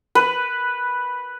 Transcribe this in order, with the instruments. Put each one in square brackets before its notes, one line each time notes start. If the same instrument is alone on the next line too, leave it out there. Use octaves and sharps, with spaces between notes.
[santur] B4